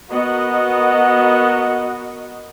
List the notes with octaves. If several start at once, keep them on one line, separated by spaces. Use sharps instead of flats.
B3 F#4 A#4 D#5 F#5